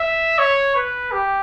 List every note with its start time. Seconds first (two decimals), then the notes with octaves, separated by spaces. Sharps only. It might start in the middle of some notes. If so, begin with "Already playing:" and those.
Already playing: E5
0.39 C#5
0.75 B4
1.12 G4